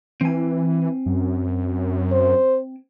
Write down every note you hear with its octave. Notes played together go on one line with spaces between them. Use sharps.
E3 C4 G#5
F#2
C5